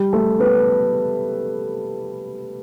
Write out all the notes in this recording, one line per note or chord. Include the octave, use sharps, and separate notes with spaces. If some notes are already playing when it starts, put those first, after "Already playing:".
Already playing: G3 G4
A3 A4
B3 B4